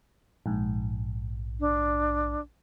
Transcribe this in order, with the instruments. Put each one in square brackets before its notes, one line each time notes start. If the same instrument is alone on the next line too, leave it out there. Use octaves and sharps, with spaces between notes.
[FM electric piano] A#1 G#2
[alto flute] D4